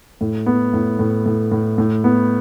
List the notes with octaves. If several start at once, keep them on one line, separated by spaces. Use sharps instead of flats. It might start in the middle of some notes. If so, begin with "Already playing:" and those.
A2
B3
A2
A2
A2
A2
A2
B3